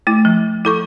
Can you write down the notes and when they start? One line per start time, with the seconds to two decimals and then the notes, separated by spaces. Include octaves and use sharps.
0.07 A3 E4
0.25 F3
0.65 E4 A4 C#6